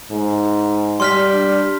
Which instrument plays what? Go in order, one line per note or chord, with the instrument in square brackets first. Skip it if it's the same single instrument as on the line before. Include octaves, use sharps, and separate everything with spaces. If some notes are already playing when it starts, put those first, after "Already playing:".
[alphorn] G#2
[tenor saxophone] G3 [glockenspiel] C6 F6 B6
[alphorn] D4